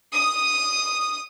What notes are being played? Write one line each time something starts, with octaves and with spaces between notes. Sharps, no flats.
D#6